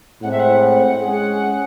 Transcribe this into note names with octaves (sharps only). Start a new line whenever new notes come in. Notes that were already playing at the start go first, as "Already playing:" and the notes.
A2 G#3 C4 F#5
E5
F#5
G#3 C#4 G#4